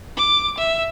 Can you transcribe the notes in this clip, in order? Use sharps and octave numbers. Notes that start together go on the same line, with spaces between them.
D6
E5